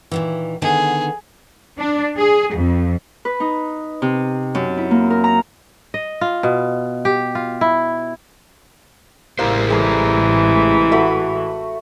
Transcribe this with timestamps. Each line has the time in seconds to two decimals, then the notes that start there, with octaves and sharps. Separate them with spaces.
0.11 A#2 D#3 E3
0.62 D3 D#3 B3 G#4
1.78 D4
2.18 G#4
2.56 F2
3.25 B4
3.40 D#4
4.02 C3
4.55 F#2
4.77 E4
4.91 A#3
5.10 A#4
5.24 A#5
5.94 D#5
6.21 F4
6.43 B2
7.05 G4
7.35 F4
7.61 E4
9.39 A1 G#3 A#3 E4 G4 C5 F5
9.70 E3 G#4 A4 A#5
10.92 A3 F#4 B5